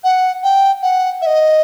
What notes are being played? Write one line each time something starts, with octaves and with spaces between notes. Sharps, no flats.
F#5
G5
F#5
E5
D#5